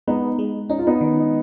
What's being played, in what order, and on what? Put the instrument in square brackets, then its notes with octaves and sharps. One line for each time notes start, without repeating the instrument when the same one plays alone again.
[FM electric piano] G#3 [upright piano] B3 D#4
[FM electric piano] G#3
[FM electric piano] C#4 [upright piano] D#4
[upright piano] F4
B3 D#4
[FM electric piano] D#3